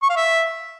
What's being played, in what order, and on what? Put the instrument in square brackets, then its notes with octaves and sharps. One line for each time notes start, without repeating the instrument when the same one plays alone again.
[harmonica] C#6
F5
E5